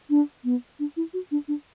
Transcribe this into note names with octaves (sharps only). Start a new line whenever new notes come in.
D4
B3
D4
E4
F#4
D4
D4